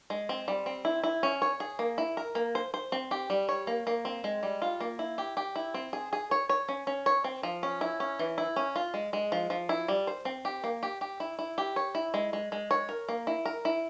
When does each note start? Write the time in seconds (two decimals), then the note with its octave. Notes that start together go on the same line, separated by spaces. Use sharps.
0.10 G#3
0.29 C4
0.48 G3
0.66 C4
0.85 E4
1.04 E4
1.23 C#4
1.42 C#5
1.60 G#4
1.79 A#3
1.98 E4
2.17 A#4
2.35 A#3
2.55 C5
2.74 C5
2.92 C4
3.11 G4
3.30 G3
3.49 C#5
3.67 A#3
3.87 A#3
4.05 C4
4.24 G#3
4.43 G3
4.62 F4
4.81 A#3
4.99 E4
5.18 G4
5.37 G4
5.56 E4
5.74 C4
5.93 G#4
6.13 G#4
6.31 C#5
6.49 C#5
6.69 C#4
6.87 C#4
7.06 C#5
7.24 C4
7.43 F3
7.63 C#4
7.81 E4
8.00 C#4
8.19 E3
8.38 E4
8.56 C#4
8.76 F4
8.94 G#3
9.13 G#3
9.32 F3
9.50 F3
9.69 E4
9.88 G3
10.07 C5
10.25 C4
10.45 G4
10.64 A#3
10.83 G4
11.01 G4
11.20 E4
11.39 E4
11.58 G4
11.76 C#5
11.95 E4
12.14 G#3
12.33 G#3
12.52 G#3
12.71 C#5
12.89 A#4
13.09 A#3
13.27 E4
13.46 A#4
13.65 E4